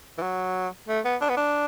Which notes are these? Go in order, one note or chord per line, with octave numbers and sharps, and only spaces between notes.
E3
F#3
A3
B3
D4
B3
D4